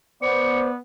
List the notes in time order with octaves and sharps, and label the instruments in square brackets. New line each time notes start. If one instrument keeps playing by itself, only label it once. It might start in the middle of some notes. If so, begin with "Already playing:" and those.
[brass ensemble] B3 [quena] C5 [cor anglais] D5 [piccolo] C#7